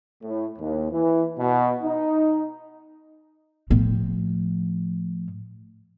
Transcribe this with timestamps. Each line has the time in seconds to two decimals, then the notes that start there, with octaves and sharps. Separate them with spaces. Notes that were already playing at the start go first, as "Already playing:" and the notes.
0.23 A2
0.59 D#2
0.91 E3
1.40 B2
1.82 D#4
3.70 A2 F3